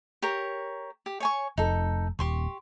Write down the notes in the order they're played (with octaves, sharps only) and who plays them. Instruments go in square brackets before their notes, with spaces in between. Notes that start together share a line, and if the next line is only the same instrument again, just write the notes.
[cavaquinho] G4 A#4 C#5
G4
C#5 G#5 C#6
[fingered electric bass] F1 [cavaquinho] D#4 A4
[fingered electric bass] D#1 [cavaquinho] G4 C6 C#6